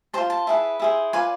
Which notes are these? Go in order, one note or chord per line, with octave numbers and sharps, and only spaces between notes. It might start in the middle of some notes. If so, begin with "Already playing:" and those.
F4 G#4 C5 A5
A5
E4 G#4 B4
E4 G#4 C5
F4 B4 D5 G#5